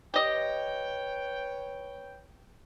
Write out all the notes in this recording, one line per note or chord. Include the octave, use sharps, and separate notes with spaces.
G4 B4 C#5 D#5 G5